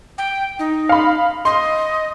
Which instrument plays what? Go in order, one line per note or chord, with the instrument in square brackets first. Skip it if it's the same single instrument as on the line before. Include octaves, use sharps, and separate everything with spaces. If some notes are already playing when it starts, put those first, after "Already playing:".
[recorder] G5
D#4
[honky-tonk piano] F5 B5
[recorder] D#5 [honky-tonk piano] C6